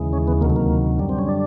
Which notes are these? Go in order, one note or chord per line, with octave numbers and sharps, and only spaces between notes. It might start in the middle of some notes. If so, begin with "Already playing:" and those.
Already playing: D#2 C#3 E3 G#3
C#4
B3
D2 C3 D#3 F#3 A#3
A3
A#3
F#2 D3 G3
C4
C#4
D4